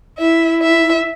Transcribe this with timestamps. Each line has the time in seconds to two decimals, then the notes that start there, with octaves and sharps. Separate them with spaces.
0.18 E4 E5
0.62 E5